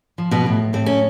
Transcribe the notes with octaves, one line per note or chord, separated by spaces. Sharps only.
F3
B2 B3
A2
A2 C4
C#4